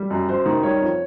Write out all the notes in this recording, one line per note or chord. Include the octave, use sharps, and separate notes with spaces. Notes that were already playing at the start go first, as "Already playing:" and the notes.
Already playing: G3
F#2
F#2 C5
D#3
G3 C#5
F2